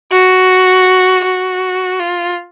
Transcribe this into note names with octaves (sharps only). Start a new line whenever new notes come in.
F#4
F#4
F4